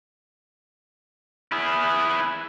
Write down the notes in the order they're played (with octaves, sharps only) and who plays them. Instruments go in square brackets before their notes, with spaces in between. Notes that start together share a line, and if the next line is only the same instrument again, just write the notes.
[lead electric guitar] E4 G#4